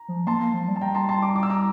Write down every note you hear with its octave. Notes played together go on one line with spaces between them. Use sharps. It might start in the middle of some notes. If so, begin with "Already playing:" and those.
Already playing: A#5
F3
A#3 A5 C6
A#3
F3
G3
A5
G3 G5 A#5
A5 C6
A5 C6
A#5 D6
D6
E6
A#5 D6